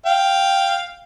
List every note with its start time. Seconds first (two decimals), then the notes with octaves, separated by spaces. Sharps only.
0.06 F5 G5